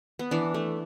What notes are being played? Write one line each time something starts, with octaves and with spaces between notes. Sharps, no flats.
B3
E3 D4
A3